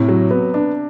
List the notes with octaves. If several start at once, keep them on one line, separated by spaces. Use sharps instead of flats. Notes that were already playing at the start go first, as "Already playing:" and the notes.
Already playing: A2 C3
F#3
B3
D4